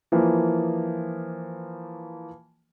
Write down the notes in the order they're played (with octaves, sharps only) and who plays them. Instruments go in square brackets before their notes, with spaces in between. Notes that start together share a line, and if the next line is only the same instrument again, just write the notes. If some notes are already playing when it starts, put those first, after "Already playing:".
[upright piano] E3 F3 A#3